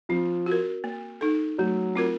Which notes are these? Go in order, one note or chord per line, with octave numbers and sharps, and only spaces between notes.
F3 C4
F#4
A#4
A#3
D#4 A4
F#3 A3
C4 F4 A#4